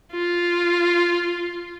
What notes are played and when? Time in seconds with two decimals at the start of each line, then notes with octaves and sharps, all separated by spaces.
0.12 F4